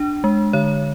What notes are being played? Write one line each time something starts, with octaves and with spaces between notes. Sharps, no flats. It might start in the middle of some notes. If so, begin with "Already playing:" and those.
Already playing: D4
G#3
D3 C#5